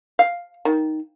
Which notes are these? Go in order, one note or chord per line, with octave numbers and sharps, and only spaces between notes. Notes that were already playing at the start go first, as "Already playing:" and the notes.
F5
D#3